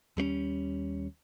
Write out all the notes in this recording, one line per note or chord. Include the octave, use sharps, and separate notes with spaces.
D#2 G3 A3 C#4